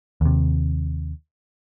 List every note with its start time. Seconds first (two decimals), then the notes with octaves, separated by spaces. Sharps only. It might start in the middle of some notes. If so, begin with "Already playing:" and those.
0.21 D#2 C3